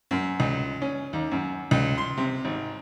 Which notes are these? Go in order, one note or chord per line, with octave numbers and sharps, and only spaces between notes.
F#2
C#2
C#4
D#2
F#2
C#2
C6
C3
G#1